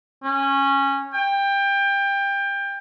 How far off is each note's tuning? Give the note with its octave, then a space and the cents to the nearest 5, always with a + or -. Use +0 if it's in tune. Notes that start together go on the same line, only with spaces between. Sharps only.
C#4 -15
G5 +20